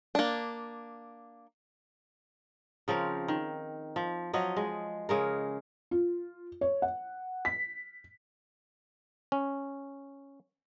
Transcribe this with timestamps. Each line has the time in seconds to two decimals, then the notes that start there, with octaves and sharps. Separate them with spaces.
0.15 A#3 D4
2.88 C#3 F3 C4 A#4
3.28 D#3
3.96 F3
4.33 F3 F#3 D#5
4.56 G#3
5.09 C#3 G#3 A#4
5.91 F4
6.61 C#5
6.82 F#5
7.45 B6
9.32 C#4